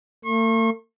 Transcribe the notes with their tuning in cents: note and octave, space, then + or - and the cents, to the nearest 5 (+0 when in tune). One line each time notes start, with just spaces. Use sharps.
A3 +45 C#6 -40